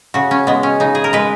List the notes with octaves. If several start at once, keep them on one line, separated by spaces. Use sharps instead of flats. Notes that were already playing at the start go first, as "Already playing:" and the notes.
C#3 F#4
C#4
G#3 B3
C#4
C#3 D#4
G#4
A#4
G#3 B4